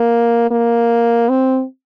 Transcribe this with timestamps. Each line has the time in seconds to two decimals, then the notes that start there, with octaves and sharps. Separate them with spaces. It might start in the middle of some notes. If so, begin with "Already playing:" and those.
Already playing: A#3
0.51 A#3
1.29 C4